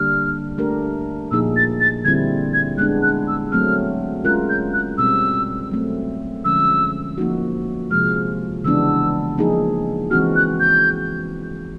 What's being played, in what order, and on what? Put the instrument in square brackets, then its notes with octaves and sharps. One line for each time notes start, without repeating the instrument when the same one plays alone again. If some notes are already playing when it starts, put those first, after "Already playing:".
Already playing: [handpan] D3 G3 A#3 D4 G4 [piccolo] F6
[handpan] A3 D4 G4 A#4
[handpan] A#2 F3 A#3 D#4 G#4 [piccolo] E6
[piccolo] A6
A6
[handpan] D3 G3 C4 E4 [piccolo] G#6
[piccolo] G#6
[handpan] G#3 B3 D4 [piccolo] F#6
[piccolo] F#6
E6
[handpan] F#3 A3 C4 [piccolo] F6
[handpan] G#3 C#4 F4 A#4 [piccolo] F#6
[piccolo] G6
F#6
[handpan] B2 G3 C4 [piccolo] E6
[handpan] F#3 A3 C4
[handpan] D3 F3 G#3 C#4 [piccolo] E6
[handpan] F3 A#3 D#4 F#4
[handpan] C3 F3 G#3 [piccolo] F6
[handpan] C#3 E3 G#3 B3 D4 [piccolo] E6
[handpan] F3 A#3 D#4 G#4
[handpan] E3 G#3 C4 D#4 F#4 [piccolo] F6
[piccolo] F#6
G6